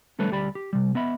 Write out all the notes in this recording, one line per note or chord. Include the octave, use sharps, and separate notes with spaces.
D3 G3 A3 A4 B4 C#5
D2 G3 G4 D5 B5
G4
C3 G3
B3 D#5 E5 B5